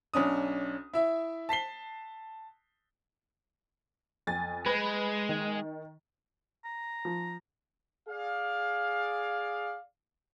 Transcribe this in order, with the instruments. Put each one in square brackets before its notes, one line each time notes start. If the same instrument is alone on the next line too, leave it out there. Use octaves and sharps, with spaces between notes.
[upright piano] B1 C#4 D4 D#6
E4 E5
A5 B6 C7 G7
[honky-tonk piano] F2 G#5 A6
[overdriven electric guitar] G#3 [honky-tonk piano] B4 B5
[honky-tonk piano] D#3
[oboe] A#5
[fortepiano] F3
[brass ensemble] G#4 D5 F5